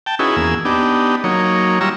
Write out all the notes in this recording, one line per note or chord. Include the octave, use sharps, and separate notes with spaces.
G5 A5
C#4 D#4 E4 F#4 G#4 B4
E2 A#3 G#4 E6
B3 D4 D#4 G4
F#3 A#3 D#4 C#5
G3 F4 A#5 C#6 E6